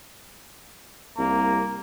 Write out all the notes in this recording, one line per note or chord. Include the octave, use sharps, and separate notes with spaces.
C2 A#3